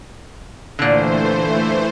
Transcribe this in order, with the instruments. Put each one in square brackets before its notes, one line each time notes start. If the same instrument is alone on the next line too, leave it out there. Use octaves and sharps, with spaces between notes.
[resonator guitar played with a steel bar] A#2 D3 [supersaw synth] E3 A3 C5